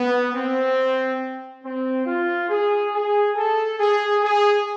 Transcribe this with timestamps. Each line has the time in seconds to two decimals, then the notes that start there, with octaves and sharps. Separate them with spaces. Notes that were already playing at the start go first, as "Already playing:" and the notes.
Already playing: B3
0.34 C4
1.64 C4
2.06 F4
2.49 G#4
2.93 G#4
3.36 A4
3.79 G#4
4.22 G#4